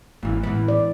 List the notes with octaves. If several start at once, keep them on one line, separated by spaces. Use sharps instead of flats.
G#1 A#2 E3
A1 E3 G#3 B3
D5